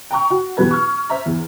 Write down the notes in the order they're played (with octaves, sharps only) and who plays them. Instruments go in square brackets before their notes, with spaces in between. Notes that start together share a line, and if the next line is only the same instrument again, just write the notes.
[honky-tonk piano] G5 A#5 C#6
F#4
E2 B2 F#3 G4 B4 G#6
C#6 F6
C5 E5 A#5
E2